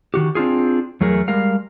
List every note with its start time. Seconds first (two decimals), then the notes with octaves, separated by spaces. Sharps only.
0.14 D#3 F#4 G4
0.35 C4 D4 F4 G#4
1.01 E2 F#3 A3 G#4 A#4
1.28 G3 G#3 A#4 F5